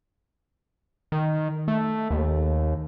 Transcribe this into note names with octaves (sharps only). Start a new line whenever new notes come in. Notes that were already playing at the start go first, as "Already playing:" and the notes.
D#3
A3
D#2